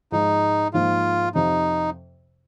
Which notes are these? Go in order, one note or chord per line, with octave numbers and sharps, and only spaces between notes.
G#2 F3 G#3 D#4
G#2 F3 A#3 D#4 F4
F2 C3 F3 D#4